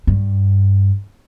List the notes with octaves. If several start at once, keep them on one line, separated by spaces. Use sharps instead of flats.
G2